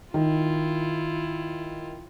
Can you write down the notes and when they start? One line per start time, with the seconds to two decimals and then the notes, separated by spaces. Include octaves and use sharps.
0.14 D#3 E4 F4